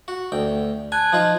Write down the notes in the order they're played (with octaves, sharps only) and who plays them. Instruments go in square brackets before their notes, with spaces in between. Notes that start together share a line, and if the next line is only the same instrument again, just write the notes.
[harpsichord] F#4
D2 G5
[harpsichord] G#5 [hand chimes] A5 F#6 G#6
[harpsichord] F3 D#4 F4